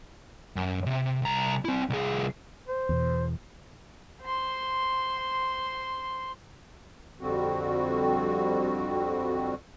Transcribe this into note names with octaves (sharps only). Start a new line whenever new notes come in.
F#2
C3
C2 A#5
C4 E4
C2 G#4
C5
E2 B2
C5 C6
F2 D3 G3 C4 F#4